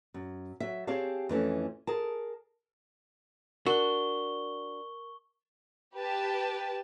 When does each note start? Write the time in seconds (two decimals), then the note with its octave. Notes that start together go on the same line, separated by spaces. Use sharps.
0.14 F#2
0.60 F#3 E5
0.87 C4 G4 G#4 C#5 F5 A5
1.29 F2 E3 A3 C#4
1.87 G#4 A#4 A5
3.66 D4 F#4 A#4 C#6 G7
5.95 G4 B4 A5